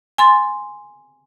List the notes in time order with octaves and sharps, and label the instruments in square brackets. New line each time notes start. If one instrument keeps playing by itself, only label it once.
[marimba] G#5 C6 A6